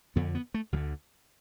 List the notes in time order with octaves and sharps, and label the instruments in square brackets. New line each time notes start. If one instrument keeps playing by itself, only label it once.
[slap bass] F2 D3 B3
B3
A3
D2 F3
D3